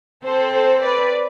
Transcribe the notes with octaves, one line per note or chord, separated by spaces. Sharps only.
C4 A4 C5
A4 C5
B4 D5